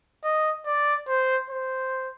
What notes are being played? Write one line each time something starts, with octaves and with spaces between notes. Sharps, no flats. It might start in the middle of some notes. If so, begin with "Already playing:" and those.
D#5
D5
C5
C5